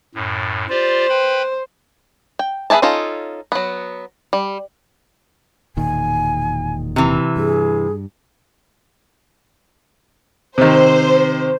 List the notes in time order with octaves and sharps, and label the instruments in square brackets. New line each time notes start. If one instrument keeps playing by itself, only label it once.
[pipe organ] F#2 A2
[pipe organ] F4 G4 D5 [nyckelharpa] C5
[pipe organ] B4 G5 B5
[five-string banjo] G5
B3 G#4 E5 G#5 A5
C#4 D#4 F4 A4
F#3 B3
G3
[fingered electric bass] E1 A#2 D#3 [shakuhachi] G#5
[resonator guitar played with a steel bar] C3 E3
[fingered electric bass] G2 [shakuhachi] G#4
[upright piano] C3 D#3 [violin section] C5